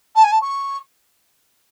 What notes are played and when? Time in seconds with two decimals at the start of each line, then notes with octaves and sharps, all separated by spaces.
0.15 A5
0.23 G#5
0.32 A5
0.41 C#6